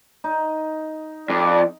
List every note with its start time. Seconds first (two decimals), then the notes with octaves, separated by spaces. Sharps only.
0.24 D#4
1.30 F2 D5